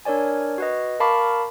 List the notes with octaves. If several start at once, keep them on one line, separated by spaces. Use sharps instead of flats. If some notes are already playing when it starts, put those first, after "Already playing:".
D4 A#4 C#5 D5 G#5
F#4 B4 D#5
A#4 F5 A5 B5 C#6 D6